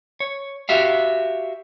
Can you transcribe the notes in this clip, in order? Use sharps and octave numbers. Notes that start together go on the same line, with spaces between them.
C#5
F#4 G4 E5 F5